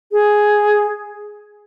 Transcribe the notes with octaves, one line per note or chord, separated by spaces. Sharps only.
G#4